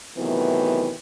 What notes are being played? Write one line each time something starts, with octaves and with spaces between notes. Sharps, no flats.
C3 D#3 E3 F#3 A3 B3